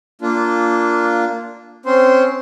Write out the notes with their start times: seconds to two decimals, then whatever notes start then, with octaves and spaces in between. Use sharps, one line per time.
0.22 A#3 D4 F4
1.86 C4 C#4 C5 C6